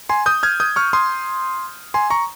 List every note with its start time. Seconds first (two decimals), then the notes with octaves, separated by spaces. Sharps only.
0.09 G#5 C6
0.26 D#6 G6
0.43 F6 G#6
0.60 D#6 G6
0.76 C#6 F6
0.93 C6 D#6
1.94 G#5 C6
2.10 A#5 C#6